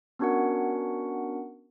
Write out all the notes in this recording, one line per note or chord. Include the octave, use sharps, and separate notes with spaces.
B3 C#4 D4 F#4 A#4 F#5